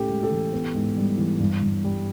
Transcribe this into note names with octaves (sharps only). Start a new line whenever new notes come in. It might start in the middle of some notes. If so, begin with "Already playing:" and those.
Already playing: A2 C#4 G4 A4
G#3
G4 A4
E3
B3
G#2
G3
E3
G2
G2
G3